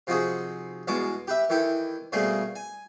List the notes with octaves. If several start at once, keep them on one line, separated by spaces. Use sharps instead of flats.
C3 F3 D#4 F#4 G#4
E2 B2 G#3 F#4 A5 D6
G4 B4 E5
D#3 E3 E4 G4 A4
B2 G3 A3 A#3 C4 G#4
G#5